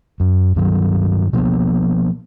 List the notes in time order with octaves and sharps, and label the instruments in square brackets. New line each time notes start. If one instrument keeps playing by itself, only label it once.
[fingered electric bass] F#2
G2 D#3 F#3
B2 F3 A#3 B3